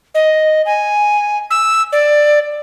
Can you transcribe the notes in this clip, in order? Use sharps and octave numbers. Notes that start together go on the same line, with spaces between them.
D#5
G#5
E6
D5